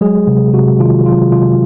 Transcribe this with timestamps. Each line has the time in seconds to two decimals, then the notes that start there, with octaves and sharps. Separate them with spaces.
0.01 F#3 G#3 G#4
0.27 C3
0.53 C3 F#4
0.80 D#3 F4
1.06 F#3 F4
1.31 C3 F4